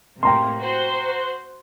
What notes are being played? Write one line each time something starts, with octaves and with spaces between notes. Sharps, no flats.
A2 C3 A#3 G5 A#5 C6
F#4 C5